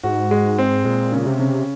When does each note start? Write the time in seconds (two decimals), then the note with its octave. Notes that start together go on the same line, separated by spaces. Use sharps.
0.03 G#2 F#4
0.31 G#3
0.58 C4
0.85 A#2 G#3
1.12 C#3
1.26 C3
1.39 C#3